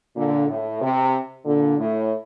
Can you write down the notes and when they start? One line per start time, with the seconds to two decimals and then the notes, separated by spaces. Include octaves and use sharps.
0.16 A#2 D3
0.48 A2
0.81 C3
1.46 A#2 D3
1.78 A2